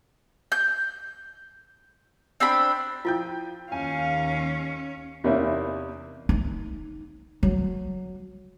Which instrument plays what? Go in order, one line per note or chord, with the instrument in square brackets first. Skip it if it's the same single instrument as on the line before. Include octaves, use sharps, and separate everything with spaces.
[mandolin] G6
C4 D4 G5 B5
[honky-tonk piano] F3 G5 G6 [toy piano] E4 F4
[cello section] D#2 F5 [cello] C#4 [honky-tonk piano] G#5
[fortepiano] E2 C3 A#3 C#4 D#4 E4
[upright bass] D#4
F#3